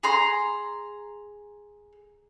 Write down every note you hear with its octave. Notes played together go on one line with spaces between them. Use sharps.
G#4 A#5 C6